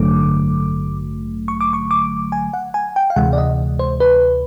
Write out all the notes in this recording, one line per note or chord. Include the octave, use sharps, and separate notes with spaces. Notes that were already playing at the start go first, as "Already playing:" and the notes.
Already playing: A1 G2 D3 F#3 A3 D6
C#6
D6
C#6
D6
G#5
F#5
G#5
G5
F5
D2 C3 E3 G#3 F#5
D5
D#5
C5
B4